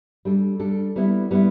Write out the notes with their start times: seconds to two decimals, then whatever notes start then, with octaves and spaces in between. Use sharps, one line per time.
0.25 G3 D4 A4
0.59 G3 D4 A4
0.96 G3 B3 E4
1.31 G3 B3 E4